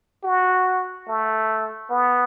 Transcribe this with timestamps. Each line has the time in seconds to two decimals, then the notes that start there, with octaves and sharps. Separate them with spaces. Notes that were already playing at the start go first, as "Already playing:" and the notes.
0.23 F#4
1.08 A3
1.90 B3